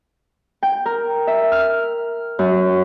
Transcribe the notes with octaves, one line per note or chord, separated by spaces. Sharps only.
G5
A#4
E5
F6
F#2